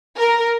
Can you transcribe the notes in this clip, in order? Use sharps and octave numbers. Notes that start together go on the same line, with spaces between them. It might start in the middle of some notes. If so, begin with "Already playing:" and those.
A#4